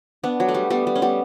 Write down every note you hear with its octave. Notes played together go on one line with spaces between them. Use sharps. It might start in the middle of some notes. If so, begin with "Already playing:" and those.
B3 D4
F#3
A3
G3
G3 B3
G3
C#4
G3 B3